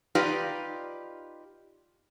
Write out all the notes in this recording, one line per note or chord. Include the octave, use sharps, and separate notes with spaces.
D#4 F4 G4 B4 D5 F5